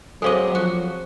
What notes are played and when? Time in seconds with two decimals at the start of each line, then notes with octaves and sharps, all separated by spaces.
0.22 F#3 G#3 C4 A4 D#5 F5 D6
0.55 F3 F#4